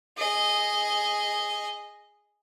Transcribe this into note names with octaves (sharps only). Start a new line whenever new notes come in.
G#4 D#5